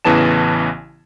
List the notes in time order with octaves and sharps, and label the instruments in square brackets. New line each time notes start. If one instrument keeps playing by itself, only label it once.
[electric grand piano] A1 C#3 E3 B3 A5 E7